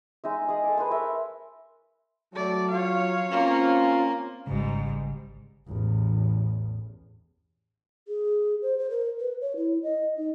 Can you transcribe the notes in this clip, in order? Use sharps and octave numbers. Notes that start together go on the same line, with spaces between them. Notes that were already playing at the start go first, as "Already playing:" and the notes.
G#3 D#4 E5
G#4 D#5
A4 D6
B4 C5 G#5
A#4 C#5 E5
F#3 A3 D5
F4 C#5 F5
A#3 C4 C#4 F4
G#1 G#2 C#3 G3
A1 E2
G#4
C5
C5
A#4
B4
C#5
E4
D#5
D#4